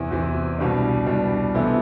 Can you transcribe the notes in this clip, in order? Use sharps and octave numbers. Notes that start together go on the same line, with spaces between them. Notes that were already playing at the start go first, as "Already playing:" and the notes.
Already playing: E2 C3 E3
E2 C3 E3
C2 B2 G3 D4
C2 B2 G3 D4
C3 E3 B3 E4 A4